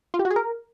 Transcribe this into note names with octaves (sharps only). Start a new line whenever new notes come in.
F4
G4
F#4
G#4
A#4